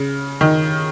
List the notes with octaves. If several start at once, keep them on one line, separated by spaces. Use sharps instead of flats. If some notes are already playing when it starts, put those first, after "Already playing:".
Already playing: C#3
D#3